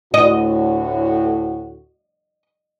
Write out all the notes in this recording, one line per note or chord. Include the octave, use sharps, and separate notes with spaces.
D2 A2 F#4 D#5